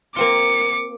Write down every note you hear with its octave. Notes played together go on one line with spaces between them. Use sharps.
A#3 C4 F4 D6 C#7